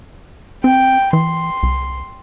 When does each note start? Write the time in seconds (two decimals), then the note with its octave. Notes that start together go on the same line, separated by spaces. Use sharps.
0.64 C4 G5
1.13 E3 C6
1.63 C2